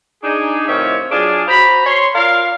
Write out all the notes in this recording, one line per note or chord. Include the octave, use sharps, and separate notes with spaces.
D4 D#4 G#4
A2 C3 D#3 F4 C#5 E5
F#3 D4 F4 G#4
F#4 C5 A#5 B5
C#5 C6
F4 A#4 D5 F5